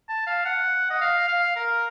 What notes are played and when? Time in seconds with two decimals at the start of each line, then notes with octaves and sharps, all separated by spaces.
0.09 A5
0.27 F5
0.45 F#5
0.90 D#5
1.01 F5
1.28 F5
1.56 A#4